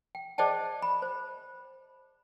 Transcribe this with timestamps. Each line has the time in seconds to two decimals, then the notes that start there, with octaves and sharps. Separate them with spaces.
0.15 G5
0.38 G#4 C5 D5 D#5 G5 A5
0.82 B5
1.02 C5